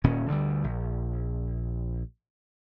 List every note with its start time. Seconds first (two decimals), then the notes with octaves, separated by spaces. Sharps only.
0.04 D#1 A#2 D#3 C#4
0.28 D2 D3 G3
0.64 A#1